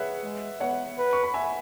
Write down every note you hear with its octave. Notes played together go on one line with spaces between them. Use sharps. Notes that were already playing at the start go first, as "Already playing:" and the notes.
Already playing: G#4 B4 C#5 E5 F#5
G#3
B3 C#5 F#5
B4
C#6
B5
E5 G#5